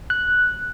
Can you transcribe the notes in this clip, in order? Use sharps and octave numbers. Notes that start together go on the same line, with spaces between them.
F#6